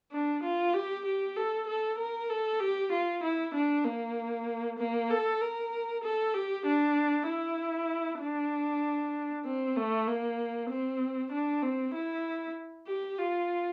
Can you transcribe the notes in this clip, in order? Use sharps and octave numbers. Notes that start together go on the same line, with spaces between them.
D4
F4
G4
G4
A4
A4
A#4
A4
G4
F4
E4
D4
A#3
A#3
A4
A#4
A4
G4
D4
E4
D4
C4
A3
A#3
C4
D4
C4
E4
G4
F4